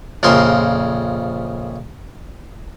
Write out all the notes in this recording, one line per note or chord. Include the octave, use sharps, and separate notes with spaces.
A#1 F2 C#3 A#4 C6